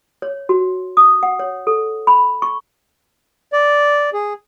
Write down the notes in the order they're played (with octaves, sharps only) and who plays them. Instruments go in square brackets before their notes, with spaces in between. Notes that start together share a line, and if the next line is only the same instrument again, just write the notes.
[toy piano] C#5
F#4
D#6
F#5
C#5
A4
B5
C#6
[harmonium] D5
G#4